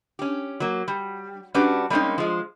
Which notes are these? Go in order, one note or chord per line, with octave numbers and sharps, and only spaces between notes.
C#4 G4
F#3 A#3
G3
G3 C#4 D4 F#4 G4 B4
G3 G#3 A#3 C4 C#4 D#4
F3 G#3